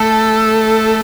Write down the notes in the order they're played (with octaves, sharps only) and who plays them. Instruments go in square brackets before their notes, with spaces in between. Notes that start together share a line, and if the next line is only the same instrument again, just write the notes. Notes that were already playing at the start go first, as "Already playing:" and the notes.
Already playing: [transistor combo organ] A3 [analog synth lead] A4